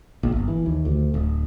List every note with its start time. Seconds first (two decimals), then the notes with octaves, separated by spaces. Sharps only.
0.23 A#1
0.36 G1
0.48 E3
0.66 D#2
0.85 D2
1.14 D1